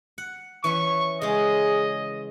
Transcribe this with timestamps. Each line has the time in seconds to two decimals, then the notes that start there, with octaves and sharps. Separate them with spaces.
0.18 F#5
0.64 E3 C#4 E5 C#6
1.22 C#3 G#3 G#4 D#5